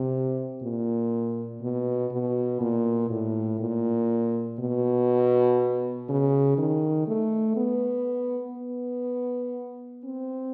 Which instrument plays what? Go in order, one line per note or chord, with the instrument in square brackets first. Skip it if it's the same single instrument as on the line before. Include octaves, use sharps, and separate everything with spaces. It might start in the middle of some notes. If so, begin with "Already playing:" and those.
Already playing: [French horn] C3
A#2
B2
B2
A#2
A2
A#2
B2
C#3
D#3
A3
B3
B3
C4